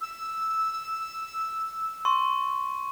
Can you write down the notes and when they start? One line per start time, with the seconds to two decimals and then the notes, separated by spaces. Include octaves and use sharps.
0.01 E6
2.05 C6 C#6